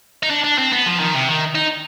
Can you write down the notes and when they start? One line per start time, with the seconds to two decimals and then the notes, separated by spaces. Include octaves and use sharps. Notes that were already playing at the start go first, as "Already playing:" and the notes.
0.23 D#4
0.30 D4
0.44 D4
0.58 C4
0.72 B3
0.86 F3
1.00 D#3
1.14 C3
1.28 D#3
1.55 D#4